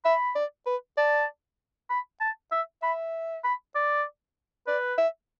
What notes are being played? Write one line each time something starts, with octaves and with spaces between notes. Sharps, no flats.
E5 B5
D5
B4
D5 A5
B5
A5
E5
E5 B5
B5
D5
B4 D5
E5